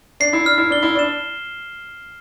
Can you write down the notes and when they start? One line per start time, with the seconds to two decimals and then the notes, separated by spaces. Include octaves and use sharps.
0.20 D4 C7
0.33 E4
0.45 D4 F6
0.58 E4
0.70 D4 G7
0.82 E4
0.95 D4 E7